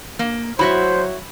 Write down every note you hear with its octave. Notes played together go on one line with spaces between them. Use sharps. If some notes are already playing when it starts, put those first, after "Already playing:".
A#3
F#3 E4 F#4 C5 E5 B5